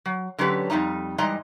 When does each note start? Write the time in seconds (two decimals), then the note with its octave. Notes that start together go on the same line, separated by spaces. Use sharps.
0.06 F#3
0.38 D3 F#3 C#4 G4 B4
0.70 F2 B2 G3 D#4 A#5
1.18 G#2 E3 G3 D#5 A#5